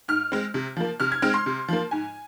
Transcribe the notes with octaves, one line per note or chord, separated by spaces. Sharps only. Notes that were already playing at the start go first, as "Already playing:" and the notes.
G#2 F6
G#3 C4
C3
F3 A#3
C3 F6
G#6
G#3 C4 F6
C6
C3
F3 A#3
G#2 G#5